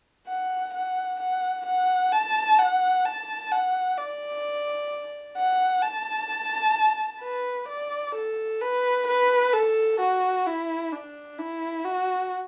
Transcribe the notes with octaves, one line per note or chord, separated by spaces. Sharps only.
F#5
F#5
F#5
F#5
A5
F#5
A5
F#5
D5
F#5
A5
B4
D5
A4
B4
B4
A4
F#4
E4
D4
E4
F#4